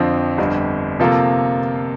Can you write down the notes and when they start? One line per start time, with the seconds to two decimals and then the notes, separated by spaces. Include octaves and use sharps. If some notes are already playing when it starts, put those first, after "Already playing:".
Already playing: F2 D3 F3 C4
0.38 G1 F2 D3 G3
0.99 C3 F3 A#3 F4 A4